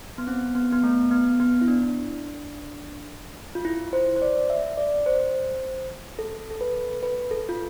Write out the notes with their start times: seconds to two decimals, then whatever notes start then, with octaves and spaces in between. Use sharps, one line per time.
0.18 B3
0.27 C4
0.55 B3
0.73 B3
0.84 A3
1.11 B3
1.40 B3
1.61 E4
1.68 D4
3.55 F4
3.65 E4
3.93 C5
4.16 C5
4.22 D5
4.50 E5
4.78 D5
5.06 C5
6.19 A4
6.51 A4
6.61 B4
7.03 B4
7.31 A4
7.49 F4